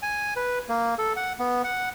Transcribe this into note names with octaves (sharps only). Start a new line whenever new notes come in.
G#5
B4
A#3
A4
F#5
B3
F#5